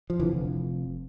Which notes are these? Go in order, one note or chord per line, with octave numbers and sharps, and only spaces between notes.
F3
F1 F2 D3 E3